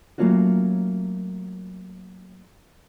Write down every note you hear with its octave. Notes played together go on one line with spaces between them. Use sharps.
F#3 A3 A#3 C#4 F4 F#4